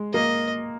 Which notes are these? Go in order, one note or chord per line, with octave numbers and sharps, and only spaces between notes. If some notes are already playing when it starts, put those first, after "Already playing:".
Already playing: G#3
A#3 D#5